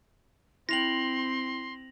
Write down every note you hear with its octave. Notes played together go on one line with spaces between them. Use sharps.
C4 E4 G5 C6 A#6 F7 F#7